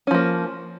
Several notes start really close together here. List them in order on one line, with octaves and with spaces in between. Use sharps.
C#4 F3 A#3